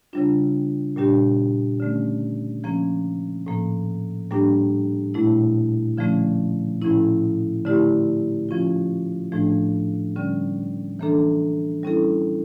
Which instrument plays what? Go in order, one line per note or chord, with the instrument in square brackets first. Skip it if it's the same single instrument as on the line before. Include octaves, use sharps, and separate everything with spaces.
[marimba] C#3 G3 D4 F4
A#2 G3 D4 G4
D3 A3 C#4
F3 A#3 C#4
A2 F3 A#3
A2 G3 A#3 D4 G4
A#2 A3 E4
D3 F3 A3 C#4
A2 F3 C#4 E4
D3 A3 E4 G4
F3 C#4 F4
A2 F3 A3 D4
D3 G3 C#4
E3 A#3 D4 A4
G3 C#4 E4 A4